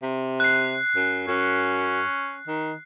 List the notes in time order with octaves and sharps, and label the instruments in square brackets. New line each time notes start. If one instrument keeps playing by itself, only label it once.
[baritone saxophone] C3
[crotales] F#6 C7
[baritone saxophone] F#2
[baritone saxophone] F#2 [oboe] C#4
[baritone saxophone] D#3